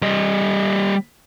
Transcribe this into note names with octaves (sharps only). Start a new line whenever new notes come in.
G3 D#5